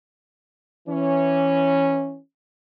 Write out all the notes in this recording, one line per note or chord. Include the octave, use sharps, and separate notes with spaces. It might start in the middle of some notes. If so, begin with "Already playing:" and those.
E3 C#4